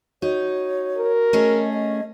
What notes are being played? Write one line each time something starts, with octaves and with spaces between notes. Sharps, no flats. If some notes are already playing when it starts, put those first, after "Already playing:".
D#4 F#4 C#5
A#4
A3 C#4 G#4 D#5
D#5